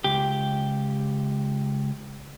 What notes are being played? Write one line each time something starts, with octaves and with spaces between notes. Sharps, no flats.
C#2 G4